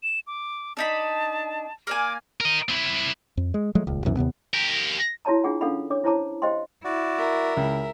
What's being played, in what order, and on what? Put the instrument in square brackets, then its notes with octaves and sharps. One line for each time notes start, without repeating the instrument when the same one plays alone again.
[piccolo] E7
D6
[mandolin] D4 D#4 B5 [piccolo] A5
[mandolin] A#3 D5 G#5 [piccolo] D6
[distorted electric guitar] A#4 D#5
C4 E4
[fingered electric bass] F2
G#3
F3 F#3 G#3 A3
D#1 C#2
C2 F#2 B2 E3
D#2 C3 B3
[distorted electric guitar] G4 A#4
[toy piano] E4 F#4 C#5 A5 A#5
D4 F4 G#4 F#5
C#4 D4 A4 F5 F#5 B5
D4 C#5 D6
E4 C5 C#5 A5 A#5 D6
G4 C5 D#5 F5 G5 C6
[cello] E4 [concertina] F#4 D5
[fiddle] A#4 E5
[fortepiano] C#2